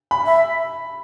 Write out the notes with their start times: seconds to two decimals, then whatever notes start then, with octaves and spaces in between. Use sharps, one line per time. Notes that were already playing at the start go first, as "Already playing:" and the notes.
0.11 B5
0.26 E5